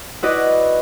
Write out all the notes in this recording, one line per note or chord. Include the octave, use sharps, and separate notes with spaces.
E4 F#4 B4 D5 D#5